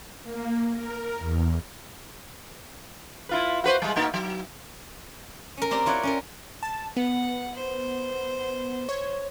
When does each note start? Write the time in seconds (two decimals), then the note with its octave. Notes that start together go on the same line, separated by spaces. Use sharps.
0.23 A#3
0.73 A#4
1.19 E2
3.29 E4 F4 B4
3.64 F#4 B4 C5
3.82 G3 G#3
3.96 B2 A#3 D#4
4.14 F#3
5.57 C#4 A#4
5.71 C4 G4 D5 A#5
5.86 E4 F4 C#5 D5 F#5
6.03 C#4 F4 A#4
6.63 A5
6.97 B3 F#5
7.55 C5
8.89 C#5